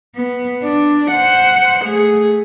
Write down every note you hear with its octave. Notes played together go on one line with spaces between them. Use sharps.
B3
D4
C5 F#5
A3 G#4